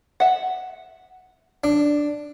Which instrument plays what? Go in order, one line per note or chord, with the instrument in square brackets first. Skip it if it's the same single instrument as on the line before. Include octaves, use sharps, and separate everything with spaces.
[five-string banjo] E5 F#5
[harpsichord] D4